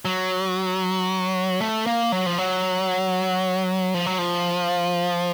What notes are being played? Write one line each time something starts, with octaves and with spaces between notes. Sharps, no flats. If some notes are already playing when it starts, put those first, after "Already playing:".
F#3
A3
A#3
F#3
F3
F#3
F3
F#3
F3